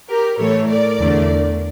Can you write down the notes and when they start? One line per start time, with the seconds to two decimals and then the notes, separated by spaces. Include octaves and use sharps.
0.09 G4 A#4
0.38 A2 E3 A3 A4 C#5
0.68 A#4 D5
0.99 E2 D3 A3